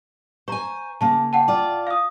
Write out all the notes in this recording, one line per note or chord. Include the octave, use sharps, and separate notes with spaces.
C5 G#5 A#5 C#6
C#3 A#3 A5
F#5 G5 A5
F4 D5
F5 D#6